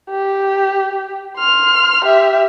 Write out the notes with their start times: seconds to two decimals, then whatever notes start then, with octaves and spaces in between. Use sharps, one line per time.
0.10 G4
1.38 C6 F6
2.05 G4 E5